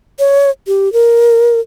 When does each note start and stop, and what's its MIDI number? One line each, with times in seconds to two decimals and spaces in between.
0.19 0.50 73
0.67 0.92 67
0.93 1.60 70